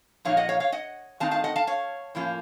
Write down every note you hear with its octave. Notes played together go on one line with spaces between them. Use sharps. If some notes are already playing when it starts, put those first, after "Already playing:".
A#2 F3 A#3 D#4 C#5 F5
D#5 F#5
C#5 F5
C#5 F5
D#5 F#5
D#3 A3 C4 D#4 F5 A5
F5 A5
D#5 F#5
F5 A5
C#5 F5
A2 F3 A#3 C#4 F4